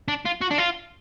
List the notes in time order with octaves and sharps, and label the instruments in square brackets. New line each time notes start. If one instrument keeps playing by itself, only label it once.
[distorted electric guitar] D4
F4
F#4
D4
F4